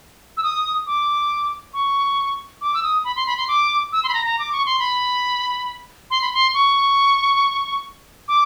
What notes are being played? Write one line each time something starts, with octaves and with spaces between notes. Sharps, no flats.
E6
D#6
D6
C#6
D6
E6
D#6
B5
C6
B5
C6
D6
E6
C6
B5
A#5
A#5
D6
C#6
C6
B5
C6
B5
C6
C#6
D6